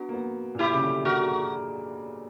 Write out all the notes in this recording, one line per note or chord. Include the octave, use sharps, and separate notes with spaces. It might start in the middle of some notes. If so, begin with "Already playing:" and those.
Already playing: B3 D4 F#4
A#3
B3
A#2
B2 E4 G4
C#3
D3
D3 F#4 A#4